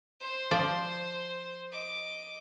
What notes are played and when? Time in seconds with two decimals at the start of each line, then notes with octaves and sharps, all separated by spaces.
0.20 C5 C6
0.51 F3 D5
1.71 D#5 D6